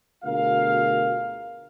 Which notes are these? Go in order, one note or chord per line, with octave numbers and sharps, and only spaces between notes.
D2 B2 F4 G#4 A#4 F5